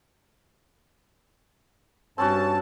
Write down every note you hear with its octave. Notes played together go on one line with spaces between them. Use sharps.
G2 C4 C#4 F#4 A5